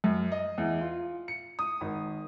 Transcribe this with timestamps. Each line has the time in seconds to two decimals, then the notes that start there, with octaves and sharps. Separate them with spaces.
0.04 F#2
0.32 D#5
0.58 E2
0.81 F4
1.28 C#7
1.59 D#6
1.81 G#1